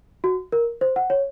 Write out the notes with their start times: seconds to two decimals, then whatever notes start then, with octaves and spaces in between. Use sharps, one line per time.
0.24 F#4
0.52 A#4
0.81 C5
0.96 F#5
1.10 C#5